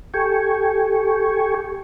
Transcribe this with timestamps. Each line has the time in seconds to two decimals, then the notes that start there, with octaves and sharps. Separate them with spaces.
0.14 G4 A4 G5 G#5 C#6